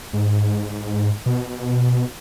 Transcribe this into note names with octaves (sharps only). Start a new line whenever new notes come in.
G#2
B2